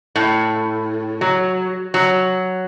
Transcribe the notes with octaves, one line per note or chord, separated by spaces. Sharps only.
A2
F#3
F#3